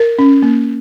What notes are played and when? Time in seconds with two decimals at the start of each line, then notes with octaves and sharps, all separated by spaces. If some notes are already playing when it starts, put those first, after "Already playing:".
Already playing: A#4
0.19 C#4
0.42 A#3